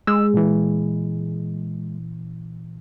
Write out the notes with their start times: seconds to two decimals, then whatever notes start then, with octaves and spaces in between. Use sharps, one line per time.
0.07 G#3 E6
0.34 A#2 E3